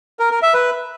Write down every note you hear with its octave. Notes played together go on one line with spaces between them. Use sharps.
A#4
A#4
E5
B4